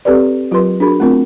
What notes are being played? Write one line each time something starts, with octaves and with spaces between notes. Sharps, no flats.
C4 G4 A4 B4 D5
F#3 F4 G4 A#4 B4 C6
D4 F#4 G#4 A#4 B5
A3 B3 C4 F4 A#4